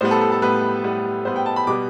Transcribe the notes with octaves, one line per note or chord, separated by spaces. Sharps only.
A2 G3 B3 C5
A4
A4
A4
A2 G3 B3 B4
A2 G3 B3
A2 G3 B3 C5
G5
A5
B5
B2 G3 B3 D6